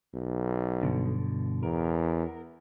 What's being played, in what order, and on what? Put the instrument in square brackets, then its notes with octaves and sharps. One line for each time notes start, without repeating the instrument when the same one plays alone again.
[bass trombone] B1
[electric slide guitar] G2 B2 D3
[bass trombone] E2 [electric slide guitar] A#4